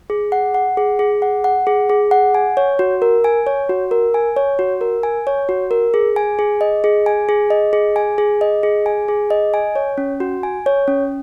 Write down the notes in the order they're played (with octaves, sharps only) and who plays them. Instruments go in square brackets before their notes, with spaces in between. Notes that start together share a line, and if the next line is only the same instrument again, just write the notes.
[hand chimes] G#4
F#5
F#5
G#4
G#4
F#5
F#5
G#4
G#4
F#5
G#5
C#5
F#4
A#4
G#5
C#5
F#4
A#4
G#5
C#5
F#4
A#4
G#5
C#5
F#4
A#4
G#4
G#5
G#4
D#5
G#4
G#5
G#4
D#5
G#4
G#5
G#4
D#5
G#4
G#5
G#4
D#5
G#5
C#5
C#4
F#4
G#5
C#5
C#4